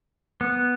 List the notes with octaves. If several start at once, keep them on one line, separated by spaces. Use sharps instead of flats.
B3